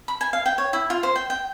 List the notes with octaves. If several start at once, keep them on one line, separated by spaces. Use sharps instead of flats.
B5
G#5
F5
G5
C#5
E4
F4
C5
G5
G5